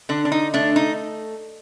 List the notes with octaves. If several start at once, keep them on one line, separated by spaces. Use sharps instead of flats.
D3 D4
D4
D#4
A3 D4
D#4